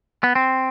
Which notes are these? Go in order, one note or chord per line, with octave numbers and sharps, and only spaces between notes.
B3
C4